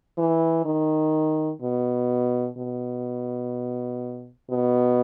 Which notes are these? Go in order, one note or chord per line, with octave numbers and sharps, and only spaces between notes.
E3
D#3
B2
B2
B2